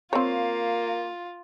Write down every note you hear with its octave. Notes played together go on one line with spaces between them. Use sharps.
A#3 C4 F4 C#5